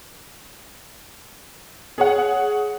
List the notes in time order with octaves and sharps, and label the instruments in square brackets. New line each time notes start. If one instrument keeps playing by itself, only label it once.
[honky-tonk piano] G#4 C#5 F#5